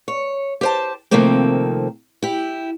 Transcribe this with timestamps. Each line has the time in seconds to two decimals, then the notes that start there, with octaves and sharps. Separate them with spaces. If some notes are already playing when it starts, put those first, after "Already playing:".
0.08 C#5
0.61 G4 C5 A5
1.11 C3 D#3 F3 A3 A#3 C4
2.22 E4 G4